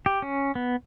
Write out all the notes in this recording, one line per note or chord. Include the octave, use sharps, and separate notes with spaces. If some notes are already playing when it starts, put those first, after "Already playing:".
G4
C#4
B3